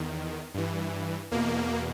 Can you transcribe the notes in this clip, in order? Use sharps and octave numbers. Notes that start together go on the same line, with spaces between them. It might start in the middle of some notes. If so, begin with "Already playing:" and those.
Already playing: E2 D#3
G2 E3
E2 B2 A#3